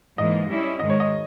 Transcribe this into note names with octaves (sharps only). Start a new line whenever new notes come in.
G#2 E3 A#3 D#5
G3 C#4 E4
G#2 D#3 G#3 D#5
C#5
D#5